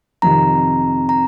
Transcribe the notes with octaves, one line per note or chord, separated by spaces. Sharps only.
F2 C3 D#3 A#5
A#5